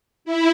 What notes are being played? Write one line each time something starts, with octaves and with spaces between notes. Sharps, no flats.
E4